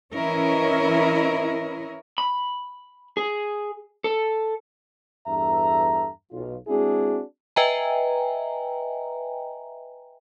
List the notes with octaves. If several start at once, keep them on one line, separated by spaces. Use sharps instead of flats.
E3 C#4 E4 A#4 C#5 D#5
B5
G#4
A4
E2 G2 A4 E5 A#5
B1 F4
G#3 C4 D4 E4 F#4 G#4
B4 D#5 E5 G5 G#5 A#5